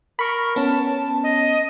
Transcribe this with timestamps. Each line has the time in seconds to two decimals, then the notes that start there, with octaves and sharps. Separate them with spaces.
0.19 A#4 B5 C#6
0.56 B3 C#4 A5
1.23 D#5